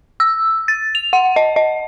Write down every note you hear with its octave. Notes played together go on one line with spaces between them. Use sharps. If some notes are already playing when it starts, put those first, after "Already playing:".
E6
A6
F7
F#5
D#5
D#5